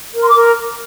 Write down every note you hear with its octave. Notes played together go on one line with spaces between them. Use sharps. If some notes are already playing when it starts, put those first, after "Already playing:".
A#4
C6
D6
A#4